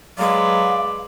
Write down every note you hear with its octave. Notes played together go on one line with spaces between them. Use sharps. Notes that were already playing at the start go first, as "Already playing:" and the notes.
F#3 G#3 B4 D5 F5